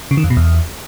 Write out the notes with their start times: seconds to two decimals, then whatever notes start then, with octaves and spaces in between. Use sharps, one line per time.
0.11 C#3
0.17 D#3
0.24 F2
0.30 B2
0.37 E2